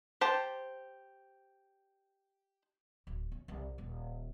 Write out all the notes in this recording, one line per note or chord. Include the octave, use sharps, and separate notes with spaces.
G4 C5 A5
D1
C#4
C2
D#1